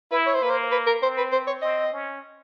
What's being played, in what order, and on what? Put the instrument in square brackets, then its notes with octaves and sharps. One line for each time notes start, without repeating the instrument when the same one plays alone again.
[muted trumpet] E4 [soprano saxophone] B4
[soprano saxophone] C#5
C5
[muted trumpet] A#3 [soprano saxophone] B4
[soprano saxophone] C5
B4
A#4
[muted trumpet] C4 [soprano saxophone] C5
[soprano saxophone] B4
C5
C#5
[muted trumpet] C4 [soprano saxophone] D#5
[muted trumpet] C#4